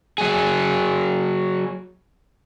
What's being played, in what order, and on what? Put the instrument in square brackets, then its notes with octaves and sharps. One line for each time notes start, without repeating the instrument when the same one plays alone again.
[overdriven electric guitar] F#3 G#4